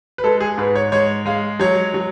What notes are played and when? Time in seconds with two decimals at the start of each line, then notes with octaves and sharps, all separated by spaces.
0.18 B4
0.24 G#3 A4
0.40 G#4
0.58 G#2 B4
0.76 C#5
0.92 G#3 C#5
1.26 G#3 F5
1.60 F#3 C#5
1.94 F#3